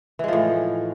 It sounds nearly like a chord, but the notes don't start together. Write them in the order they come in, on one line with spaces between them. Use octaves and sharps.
E3 G#3 F3 A2